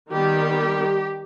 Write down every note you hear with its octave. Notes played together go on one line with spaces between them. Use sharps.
D#3 G3 B3 G4